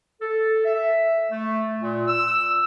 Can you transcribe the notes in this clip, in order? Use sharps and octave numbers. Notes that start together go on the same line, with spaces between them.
A4
E5
A3
A#2
E6